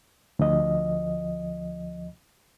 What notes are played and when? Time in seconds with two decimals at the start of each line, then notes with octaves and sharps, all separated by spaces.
0.39 D2 F3 D#5